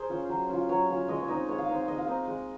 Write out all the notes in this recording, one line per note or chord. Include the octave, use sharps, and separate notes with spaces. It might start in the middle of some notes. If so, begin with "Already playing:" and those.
Already playing: G#4 A#4 C5
C#4 F4
F#3
C#4 F4
F#3 C#5
C#4 F4
G#3 D#5
C#5
C4 D#4 D#5
G#3 C#5
F5
C4 D#4 D#5
F5
G#3 D#5
F5
C4 D#4 D#5
G#3